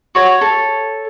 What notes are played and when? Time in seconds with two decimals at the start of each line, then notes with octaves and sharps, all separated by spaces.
0.15 F#4 C#5
0.41 A4